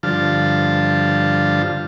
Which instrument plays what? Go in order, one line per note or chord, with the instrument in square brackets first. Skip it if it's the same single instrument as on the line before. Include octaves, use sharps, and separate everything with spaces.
[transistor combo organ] G2 D3 F3 F4 A5